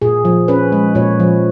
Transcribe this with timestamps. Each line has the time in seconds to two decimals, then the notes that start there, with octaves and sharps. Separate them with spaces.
0.02 A#2 G#4
0.25 F3
0.48 C#4 B4
0.72 G#3
0.95 A#2 C#5
1.20 F3